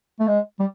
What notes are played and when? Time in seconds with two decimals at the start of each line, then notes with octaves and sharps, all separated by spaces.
0.20 A3
0.28 G#3
0.60 G3